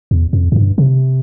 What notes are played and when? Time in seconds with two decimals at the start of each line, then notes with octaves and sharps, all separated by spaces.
0.11 E2
0.33 F2
0.52 F#2
0.56 G2
0.78 C3